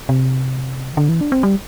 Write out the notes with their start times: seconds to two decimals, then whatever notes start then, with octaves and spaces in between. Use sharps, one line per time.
0.09 C3
0.93 E3
0.97 D3
1.09 E3
1.21 D4
1.32 C4
1.43 G3